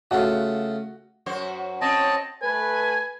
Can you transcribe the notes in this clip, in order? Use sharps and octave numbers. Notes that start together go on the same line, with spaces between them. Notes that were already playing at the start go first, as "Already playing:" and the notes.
C#3 A3 F4 F#4 F#5
F#2 F#4 C5
C4 C#4 D#5 A5
A3 A4 B4 G#5